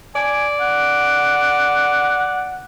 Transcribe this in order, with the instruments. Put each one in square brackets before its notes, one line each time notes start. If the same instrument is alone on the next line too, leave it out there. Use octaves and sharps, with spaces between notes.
[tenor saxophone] D5 [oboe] G#5
[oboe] F#5